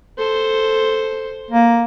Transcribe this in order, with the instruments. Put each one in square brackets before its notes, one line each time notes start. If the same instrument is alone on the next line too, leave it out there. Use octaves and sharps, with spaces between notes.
[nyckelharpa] A4 C5
[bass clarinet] A#3